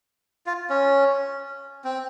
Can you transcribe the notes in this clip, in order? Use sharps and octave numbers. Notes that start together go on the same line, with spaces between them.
F4
C#4
C4